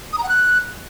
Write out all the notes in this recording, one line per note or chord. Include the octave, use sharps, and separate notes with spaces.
D#6
A#5
F#5
F#6